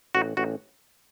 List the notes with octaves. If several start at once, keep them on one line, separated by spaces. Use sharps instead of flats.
A1 F#4
A1 F#4